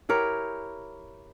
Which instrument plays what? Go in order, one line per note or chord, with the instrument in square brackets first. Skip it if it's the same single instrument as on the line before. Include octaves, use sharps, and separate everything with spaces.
[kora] E4 G4 A#4 C#5